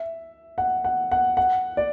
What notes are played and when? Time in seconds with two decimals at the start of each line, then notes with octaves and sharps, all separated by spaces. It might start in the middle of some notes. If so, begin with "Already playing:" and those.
Already playing: E5
0.58 F#5
0.84 F#5
1.11 F#5
1.37 F#5
1.77 D5